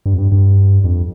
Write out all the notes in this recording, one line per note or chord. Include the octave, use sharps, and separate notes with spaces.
G2
F2
G2
G2
F2